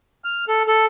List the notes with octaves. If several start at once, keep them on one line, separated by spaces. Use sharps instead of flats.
F6
A4
A4